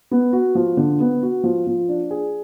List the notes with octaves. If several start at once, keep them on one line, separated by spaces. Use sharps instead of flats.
B3
F#4
F3
D3
B3
F#4
F3
F3
D4
G#4